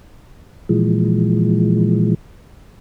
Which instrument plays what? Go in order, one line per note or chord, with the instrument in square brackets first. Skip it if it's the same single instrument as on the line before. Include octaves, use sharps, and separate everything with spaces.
[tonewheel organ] A#2 E3 F3 G#3